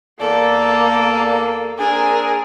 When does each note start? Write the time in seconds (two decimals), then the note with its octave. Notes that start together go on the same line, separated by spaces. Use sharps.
0.21 E2 A#3 A4 D5
1.79 A#3 C4 D4 G#4 A#4